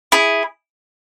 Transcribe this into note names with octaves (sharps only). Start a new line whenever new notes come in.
E4 G#4